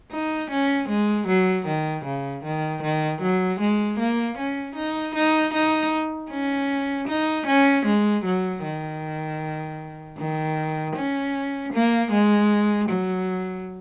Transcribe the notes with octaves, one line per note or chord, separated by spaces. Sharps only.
D#4
C#4
G#3
F#3
D#3
C#3
D#3
D#3
F#3
G#3
A#3
C#4
D#4
D#4
D#4
C#4
D#4
C#4
G#3
F#3
D#3
D#3
C#4
A#3
G#3
F#3